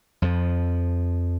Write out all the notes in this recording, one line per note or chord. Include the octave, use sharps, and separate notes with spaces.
F2 F3